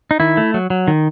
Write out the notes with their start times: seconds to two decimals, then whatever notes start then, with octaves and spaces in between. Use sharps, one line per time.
0.11 D#4
0.20 D#3 E4
0.37 A3
0.54 F#3
0.70 F#3
0.88 D#3